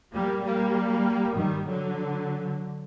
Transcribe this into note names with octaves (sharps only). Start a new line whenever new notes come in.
G3 A#3
G3 A#3
D#3 G3
D3 F#3